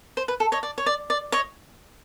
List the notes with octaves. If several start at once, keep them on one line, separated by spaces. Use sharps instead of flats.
C5
B4
A4
C#5 D#5
D5
C#5
D5
D5
C#5 D#5